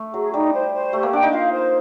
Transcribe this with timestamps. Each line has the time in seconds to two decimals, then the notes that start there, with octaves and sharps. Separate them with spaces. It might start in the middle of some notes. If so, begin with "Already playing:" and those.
Already playing: A3
0.13 F#3 G#4
0.33 G3 D#4
0.53 C5
0.74 C5
0.92 A3 G4
1.03 A#3
1.13 D4 G5
1.23 D#4
1.32 F4 F5
1.52 C5